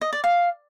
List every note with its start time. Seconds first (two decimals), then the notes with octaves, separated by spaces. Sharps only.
0.01 D#5
0.13 D5
0.24 F5